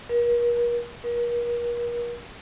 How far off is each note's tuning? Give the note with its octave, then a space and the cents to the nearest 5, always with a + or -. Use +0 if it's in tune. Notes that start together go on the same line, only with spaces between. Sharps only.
A#4 +40
A#4 +40